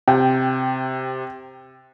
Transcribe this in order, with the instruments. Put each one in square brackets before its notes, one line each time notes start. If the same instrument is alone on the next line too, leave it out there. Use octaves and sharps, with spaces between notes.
[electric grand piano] C3 [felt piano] G5